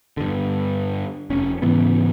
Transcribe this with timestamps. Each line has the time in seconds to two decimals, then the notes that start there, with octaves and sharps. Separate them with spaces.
0.17 G2 D3
1.30 F1 C#4
1.62 G#2 C#3 E3 B3